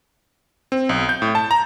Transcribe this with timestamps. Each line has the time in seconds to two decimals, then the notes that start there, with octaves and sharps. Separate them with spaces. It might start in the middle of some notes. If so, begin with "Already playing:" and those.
0.72 C4
0.89 B1
1.09 G6
1.22 A2
1.35 A5
1.51 A#5